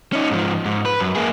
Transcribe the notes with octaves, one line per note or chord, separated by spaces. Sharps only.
C#4 D#4
G#2 F3
G#2
B4
F#2
A#3 G#4